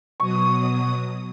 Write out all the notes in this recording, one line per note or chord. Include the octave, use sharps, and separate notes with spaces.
B2 F#3 C#6 D#6